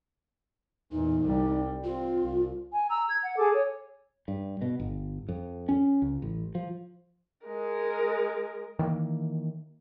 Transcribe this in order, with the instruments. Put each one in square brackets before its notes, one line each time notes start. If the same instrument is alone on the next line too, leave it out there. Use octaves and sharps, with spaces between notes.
[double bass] E2 A#2 [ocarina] D#4
[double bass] C2 G3
[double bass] C4 [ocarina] F4
[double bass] C2
[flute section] G#5
A#5 E6
G#6
F#5
G#4 A4 D6
C#5
[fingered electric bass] G2
B2
G1
F2
C#4
C#2
A1
F3
[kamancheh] G#3 A#4
[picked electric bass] D#3 E3 G3 A#3